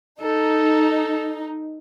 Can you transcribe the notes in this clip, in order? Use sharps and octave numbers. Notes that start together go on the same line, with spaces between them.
D#4 A4